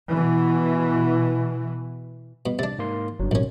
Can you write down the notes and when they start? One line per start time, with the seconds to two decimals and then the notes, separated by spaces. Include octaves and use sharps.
0.11 B2 E3
2.46 B2
2.59 C3 D4 A6
2.78 G#2 A#3 C6
3.20 F#1 G2 F#3
3.31 B1 F#2 A2 C3 C#4